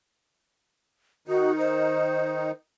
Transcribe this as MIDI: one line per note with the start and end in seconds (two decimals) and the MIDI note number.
1.28 2.51 51
1.28 2.51 63
1.28 1.52 66
1.58 2.50 72